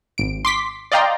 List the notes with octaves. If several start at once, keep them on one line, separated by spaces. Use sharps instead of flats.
G#1 D7
C6 D6 B6
D5 D#5 F5 G5 A#5 C6